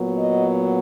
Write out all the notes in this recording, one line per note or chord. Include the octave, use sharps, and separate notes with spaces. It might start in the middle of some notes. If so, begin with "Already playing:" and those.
Already playing: A#2 F#3 B3
D#5